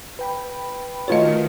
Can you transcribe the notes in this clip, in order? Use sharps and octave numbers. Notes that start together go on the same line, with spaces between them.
B4 G5 B5
D#3 A3 F4 F#4 B4 C#5 D#5